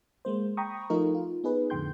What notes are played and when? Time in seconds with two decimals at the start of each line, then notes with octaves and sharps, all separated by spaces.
0.25 G#3 A#3 C5
0.57 G5 A#5 B5 C#6 D#6
0.90 F3 A3 D#4 F4 A#4
1.14 F4
1.44 B3 D#4 G#4 B4
1.70 F2 A2 D3 G5 C6 G6